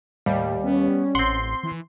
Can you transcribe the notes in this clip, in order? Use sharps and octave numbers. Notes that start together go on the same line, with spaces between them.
D#2 A2 G3
B3 C#4
A1 C4 F#5 C6
E3